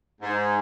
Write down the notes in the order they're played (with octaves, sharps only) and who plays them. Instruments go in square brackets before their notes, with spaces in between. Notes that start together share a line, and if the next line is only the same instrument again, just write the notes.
[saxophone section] G#2